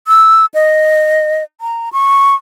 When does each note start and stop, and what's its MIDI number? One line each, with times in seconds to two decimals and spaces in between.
0.08 0.45 88
0.54 1.43 75
1.61 1.89 82
1.93 2.35 85